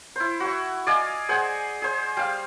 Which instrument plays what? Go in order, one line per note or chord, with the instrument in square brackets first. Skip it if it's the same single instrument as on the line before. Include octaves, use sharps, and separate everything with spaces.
[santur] E4 C5
F#4 C#6
D5 D#5 F5 G#5
G#4 C5 F#5 G#5
G#4 C5
G3 F5